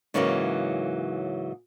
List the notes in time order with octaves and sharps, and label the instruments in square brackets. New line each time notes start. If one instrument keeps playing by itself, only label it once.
[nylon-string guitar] G#2 C#3 E3 F#3 G#3 A#3